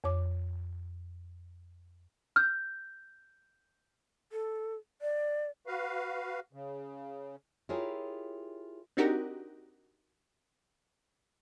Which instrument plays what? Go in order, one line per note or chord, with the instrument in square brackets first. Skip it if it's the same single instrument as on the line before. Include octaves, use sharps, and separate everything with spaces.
[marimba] F2 C#5 D6
[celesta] F6 G6
[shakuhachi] A4
D5
[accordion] F#4 B4 F5
C#3
[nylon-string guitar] E4 F4 G4 G#4 A#4 C#5
[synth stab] C4 D4 D#4 F#4 G4 A#4